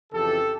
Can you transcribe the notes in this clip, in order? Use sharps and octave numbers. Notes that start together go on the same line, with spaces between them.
F2 C#3 E3 G4 A4